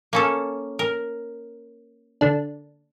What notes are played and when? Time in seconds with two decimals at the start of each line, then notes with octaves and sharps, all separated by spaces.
0.13 A#3 C#4 A4
0.79 A#4
2.21 D3 D4